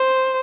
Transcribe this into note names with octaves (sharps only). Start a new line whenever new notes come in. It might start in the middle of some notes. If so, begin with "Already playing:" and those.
Already playing: C5